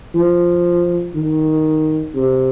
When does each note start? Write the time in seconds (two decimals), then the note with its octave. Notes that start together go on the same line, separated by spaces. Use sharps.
0.15 F3
1.15 D#3
2.15 C3